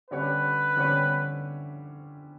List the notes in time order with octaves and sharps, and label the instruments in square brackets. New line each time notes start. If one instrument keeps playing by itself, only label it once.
[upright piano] D3 G3 C#4 G4 C#5 [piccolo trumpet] B4
[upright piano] D3 G3 C#4 G4 C#5